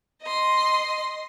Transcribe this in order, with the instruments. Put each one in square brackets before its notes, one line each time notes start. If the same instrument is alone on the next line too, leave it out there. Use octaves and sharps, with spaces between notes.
[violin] D#5 C6